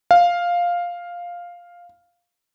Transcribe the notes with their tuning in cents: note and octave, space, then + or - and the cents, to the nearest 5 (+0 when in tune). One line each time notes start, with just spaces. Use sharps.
F5 +5